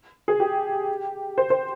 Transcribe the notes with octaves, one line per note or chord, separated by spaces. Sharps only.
G#4
G4
C5
C5